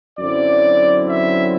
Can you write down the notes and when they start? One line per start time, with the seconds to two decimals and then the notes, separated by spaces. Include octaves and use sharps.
0.18 F#2 D3 F#3 C4 E4 D5
1.06 E5